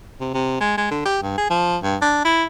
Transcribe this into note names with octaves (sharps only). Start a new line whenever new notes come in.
C3
C3
G#3
G#3
D3
G4
G2
G#4
F3
G2
D4
E4